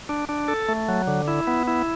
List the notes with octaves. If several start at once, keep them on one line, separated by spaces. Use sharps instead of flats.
D4
D4
A4
A3
F#3
D3
E4
B3
E4